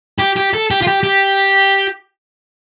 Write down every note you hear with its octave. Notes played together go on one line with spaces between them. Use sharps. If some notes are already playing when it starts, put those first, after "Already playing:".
G4
G4
A4
G4
F4
G4
G4